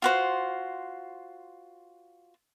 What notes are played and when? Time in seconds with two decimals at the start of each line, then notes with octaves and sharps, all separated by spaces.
0.02 F4 F#4 C5